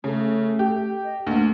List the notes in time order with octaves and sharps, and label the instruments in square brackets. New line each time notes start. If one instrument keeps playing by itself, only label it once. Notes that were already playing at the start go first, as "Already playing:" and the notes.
[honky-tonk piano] C#3 [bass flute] A3
[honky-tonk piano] G4
[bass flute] D#5
[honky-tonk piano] D2 [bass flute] A#3